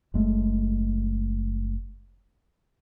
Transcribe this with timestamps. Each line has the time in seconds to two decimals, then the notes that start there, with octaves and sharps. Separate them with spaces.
0.14 F#1 G#3 A3